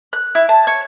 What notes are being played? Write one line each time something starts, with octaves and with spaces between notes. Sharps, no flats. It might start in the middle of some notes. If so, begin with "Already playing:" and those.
F#6
E4
A5
C#5